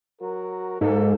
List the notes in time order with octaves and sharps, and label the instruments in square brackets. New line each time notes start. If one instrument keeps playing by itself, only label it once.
[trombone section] F#3 F#4 A#4
[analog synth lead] G#2 [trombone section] F#3 A#3 A4